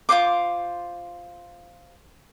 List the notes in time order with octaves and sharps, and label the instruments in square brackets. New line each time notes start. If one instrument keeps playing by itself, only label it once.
[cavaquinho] F4 F#4 C5 D6